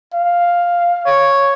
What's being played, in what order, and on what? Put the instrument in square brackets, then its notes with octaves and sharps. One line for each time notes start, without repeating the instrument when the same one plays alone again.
[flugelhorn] F5
[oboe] C#5